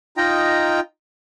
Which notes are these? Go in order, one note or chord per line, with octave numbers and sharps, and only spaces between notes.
D#4 F4 D#5 G5 A#5